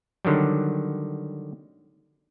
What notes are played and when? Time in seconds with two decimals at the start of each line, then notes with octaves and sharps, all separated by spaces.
0.25 D3 D#3 F#3 G3